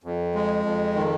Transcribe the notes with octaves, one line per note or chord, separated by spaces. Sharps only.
F2
G#3
F2
D#3